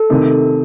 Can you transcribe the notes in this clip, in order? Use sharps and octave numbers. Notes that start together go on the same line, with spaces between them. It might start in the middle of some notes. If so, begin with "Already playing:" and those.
Already playing: A4
C3 D#3 A3 D#4